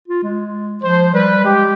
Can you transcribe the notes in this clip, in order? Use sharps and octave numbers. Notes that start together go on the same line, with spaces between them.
F4
G#3
F3 C5
G3 B4
G#3 G4